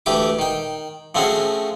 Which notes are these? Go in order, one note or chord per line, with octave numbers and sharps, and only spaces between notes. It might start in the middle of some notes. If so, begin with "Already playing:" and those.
D2 E3 A3 G4 D6
D#3 G5
F3 A3 C4 C#4 F#4 G#4